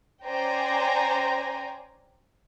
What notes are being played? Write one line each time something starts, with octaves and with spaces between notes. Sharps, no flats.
C#4 C5 D5 G5 G#5 A#5